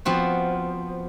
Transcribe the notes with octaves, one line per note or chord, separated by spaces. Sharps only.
F3 B3 C4 F#4